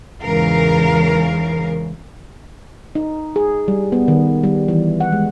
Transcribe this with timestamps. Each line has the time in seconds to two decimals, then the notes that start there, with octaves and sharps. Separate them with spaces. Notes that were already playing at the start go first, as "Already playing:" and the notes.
0.22 E2 G#2 C#3 E3 A#4 F5
2.95 D#4
3.36 G#4
3.68 G3
3.92 B3
4.08 D#3
4.44 G3
4.68 E3
5.01 F#5
5.12 G#3